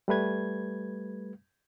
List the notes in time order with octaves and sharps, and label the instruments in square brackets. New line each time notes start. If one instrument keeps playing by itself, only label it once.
[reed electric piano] G3 A3 B4 G#6